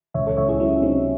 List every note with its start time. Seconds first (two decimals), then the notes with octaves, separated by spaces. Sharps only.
0.14 C#2 C#5 E5
0.26 A4 C#5
0.37 C#2 C#5 E5
0.49 E4 G#4
0.60 F#3 C#4 E4
0.82 C3 C4 D#4